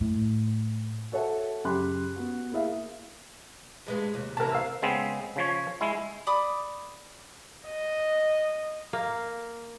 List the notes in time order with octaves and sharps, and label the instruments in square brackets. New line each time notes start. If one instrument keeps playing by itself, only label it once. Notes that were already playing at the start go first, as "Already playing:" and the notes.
[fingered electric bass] A2
[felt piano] F#4 A4 C#5 E5 F#5 A5
F#2 C#3 G4 B5 C6 F#6
B3 F#4
A#3 E4 G#4 E5 F5
[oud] G2 G#3 B3
D#2 C3
[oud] C3 E3 [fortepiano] A#4 A5
[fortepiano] F5 E6
[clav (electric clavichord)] C#3 G#3 B3 C4
C#3 F3 C#5
G#3 E4
[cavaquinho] D5 B5 D6 D#6
[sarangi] D#5
[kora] A#3